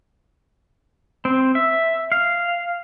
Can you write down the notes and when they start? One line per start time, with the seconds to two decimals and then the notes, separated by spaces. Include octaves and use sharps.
1.25 C4
1.55 E5
2.12 F5